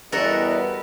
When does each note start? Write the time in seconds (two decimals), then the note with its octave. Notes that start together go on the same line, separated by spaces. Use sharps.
0.12 E2 G3 B3 F#4 A4 A#4 D#5